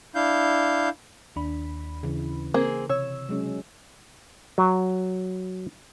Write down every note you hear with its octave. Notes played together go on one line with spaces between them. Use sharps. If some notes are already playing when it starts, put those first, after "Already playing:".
D4 E4 F5 G6
D#2 D4 B5
C#3 E3
A#3 C4 G#4
C3 C#5 E6
F#3 G#3 C#4
F#3